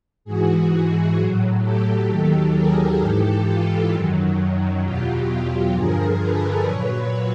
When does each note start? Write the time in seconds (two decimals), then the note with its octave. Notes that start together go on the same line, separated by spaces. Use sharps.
0.25 G#2 E3 F#4 G#4
1.16 A2 F#3
1.62 G4 A4
2.09 D#2 D#3 F#3
2.53 G#4 A#4
3.00 G#2 E3 G4 A4
3.45 F4
3.91 F#2 D#3 F#3
4.83 E2 B2 F#3 F4 G4
5.28 F4 G4
5.74 G2 D3 F3 G#4 A#4
6.20 A4 B4
6.65 A#2 F#3 B4 C#5